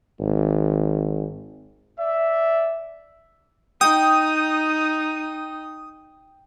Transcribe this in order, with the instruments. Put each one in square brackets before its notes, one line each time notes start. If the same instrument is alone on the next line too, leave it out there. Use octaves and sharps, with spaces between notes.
[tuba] G#1
[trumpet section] D5 E5
[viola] D#4 [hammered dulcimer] G5 [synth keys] D#6